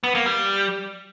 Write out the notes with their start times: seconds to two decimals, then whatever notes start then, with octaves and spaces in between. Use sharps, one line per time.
0.04 B3
0.15 A#3
0.26 G3